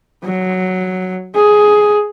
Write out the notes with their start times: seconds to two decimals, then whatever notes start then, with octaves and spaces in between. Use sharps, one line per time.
0.24 F#3
1.35 G#4